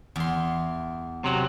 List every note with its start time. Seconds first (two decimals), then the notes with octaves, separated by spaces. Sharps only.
0.16 E2 C6
1.24 C3 F#3